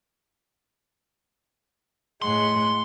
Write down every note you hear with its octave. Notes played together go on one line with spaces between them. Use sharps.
A2 G#3 F#5 C6